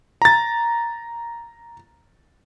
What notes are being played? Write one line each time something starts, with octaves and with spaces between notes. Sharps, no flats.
A#5 A6